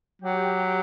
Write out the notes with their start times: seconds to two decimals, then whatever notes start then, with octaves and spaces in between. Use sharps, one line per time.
0.21 F#3 G4